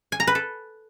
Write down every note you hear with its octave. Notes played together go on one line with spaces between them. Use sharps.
G#5
A#5
B4
A4